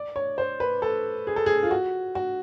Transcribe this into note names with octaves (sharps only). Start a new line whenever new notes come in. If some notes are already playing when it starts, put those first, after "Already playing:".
Already playing: D5
C#5
C5
B4
A4
G#4
A4
G#4
F4
F#4
F#4